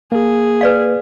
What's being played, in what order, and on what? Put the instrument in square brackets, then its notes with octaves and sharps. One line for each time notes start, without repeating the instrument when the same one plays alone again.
[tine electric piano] A#3 [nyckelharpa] G#4
[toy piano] B4 D5 F5